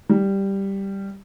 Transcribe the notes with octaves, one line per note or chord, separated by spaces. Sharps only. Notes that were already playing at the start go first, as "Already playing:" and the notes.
G3